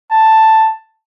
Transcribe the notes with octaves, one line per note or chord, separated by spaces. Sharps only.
A5